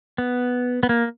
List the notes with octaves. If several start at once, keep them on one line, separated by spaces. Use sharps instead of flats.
B3
B3
A#3